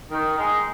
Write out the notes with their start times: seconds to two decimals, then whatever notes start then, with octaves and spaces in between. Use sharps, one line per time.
0.11 D#3
0.38 G#3 D#4